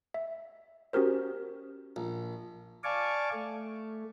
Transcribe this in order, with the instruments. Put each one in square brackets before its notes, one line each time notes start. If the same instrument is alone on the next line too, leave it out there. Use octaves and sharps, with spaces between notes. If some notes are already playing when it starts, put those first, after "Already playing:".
[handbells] E5
C#4 F#4 G4 A#4 C5
[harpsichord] A#1
[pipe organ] D5 F5 G#5 A5 C#6 D6
A3